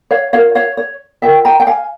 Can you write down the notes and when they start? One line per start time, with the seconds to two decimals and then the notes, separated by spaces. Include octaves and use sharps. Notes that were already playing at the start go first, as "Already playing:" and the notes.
0.11 C#5 F5
0.33 F4 A#4 C#5 F5
0.55 C#5 F5
0.77 C#5
1.22 F4 A#4 E5 G5
1.45 G5 A#5
1.60 G5
1.67 F5 G#5